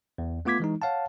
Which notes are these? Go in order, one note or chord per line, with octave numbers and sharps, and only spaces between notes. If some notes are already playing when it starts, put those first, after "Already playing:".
E2
A3 B3 F4 D6 G#6 B6
E3 G#3 D#4
C#5 F5 F#5 A5